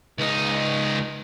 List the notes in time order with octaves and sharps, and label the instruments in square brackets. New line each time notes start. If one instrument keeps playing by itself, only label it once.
[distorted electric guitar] C#2 D#4